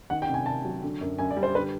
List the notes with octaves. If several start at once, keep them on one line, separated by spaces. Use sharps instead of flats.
D#3 F#5
G5
C3
G#5
C3 A5
F#3
D3
F#2
F#2 G#5
D5
G3
C5
D3 B4